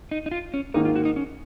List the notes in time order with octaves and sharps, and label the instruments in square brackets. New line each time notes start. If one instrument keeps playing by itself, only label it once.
[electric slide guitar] D#4
D#4
F4
C#4
[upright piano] G#2 D#3 A#3 [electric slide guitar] D#4
[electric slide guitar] F4
F#4
D#4
C#4